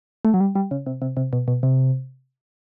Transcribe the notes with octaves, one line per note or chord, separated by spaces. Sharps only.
A3
F#3
G3
G3
C#3
C3
C3
C3
B2
B2
C3